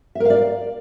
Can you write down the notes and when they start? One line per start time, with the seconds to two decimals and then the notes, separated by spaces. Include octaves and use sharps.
0.15 E5
0.20 A#4
0.25 F5
0.30 D5